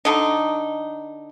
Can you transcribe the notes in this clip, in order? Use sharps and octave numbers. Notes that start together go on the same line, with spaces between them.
D3 D#4